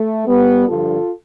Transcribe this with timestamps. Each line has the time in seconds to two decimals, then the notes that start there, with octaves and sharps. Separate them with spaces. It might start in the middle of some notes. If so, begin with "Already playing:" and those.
Already playing: A3
0.27 G3 B3
0.68 G2 D3 F3 F4 A4